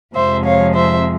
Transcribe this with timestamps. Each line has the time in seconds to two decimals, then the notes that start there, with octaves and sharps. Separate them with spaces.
0.15 F2 C3 F3 G#3 C5 E5
0.45 C#5 F5
0.74 C5 E5